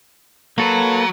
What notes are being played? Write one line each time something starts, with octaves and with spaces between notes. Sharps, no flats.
F#3 A#3 A4 B4